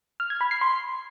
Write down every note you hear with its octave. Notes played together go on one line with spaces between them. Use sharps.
F6
G#6
B5
C7
C6